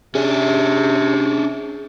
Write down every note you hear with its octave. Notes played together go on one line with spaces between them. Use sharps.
C3 C#4 D4 G#4